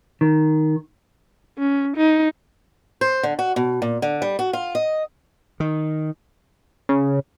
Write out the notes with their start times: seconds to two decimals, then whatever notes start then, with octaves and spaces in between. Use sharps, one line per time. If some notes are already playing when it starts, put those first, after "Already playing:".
0.21 D#3
1.58 C#4
1.97 D#4
3.01 C5
3.23 D3
3.39 F#4
3.56 B2
3.82 A#2
4.02 D3
4.22 G3
4.39 F#4
4.53 F4
4.75 D#5
5.60 D#3
6.89 C#3